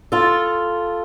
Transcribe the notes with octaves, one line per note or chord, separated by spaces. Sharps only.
F4 A4